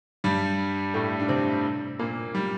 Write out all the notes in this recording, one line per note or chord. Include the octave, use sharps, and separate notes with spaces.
G2 G3
A2 A3
D4
C3 C4
A#2 A#3
G3